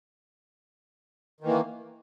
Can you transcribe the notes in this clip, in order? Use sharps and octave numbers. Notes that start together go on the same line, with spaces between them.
D#3 E3 A#3